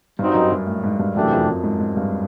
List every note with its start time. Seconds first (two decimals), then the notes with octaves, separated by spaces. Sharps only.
0.19 G2 G3 C4 D#4 F#4
0.35 F#2
0.52 F#2
0.67 A2
0.84 G#2
0.99 G2
1.16 F#2 C3 E3 A3 D4 G4
1.32 F2
1.48 F#2
1.64 G#2
1.80 G#2
1.97 G2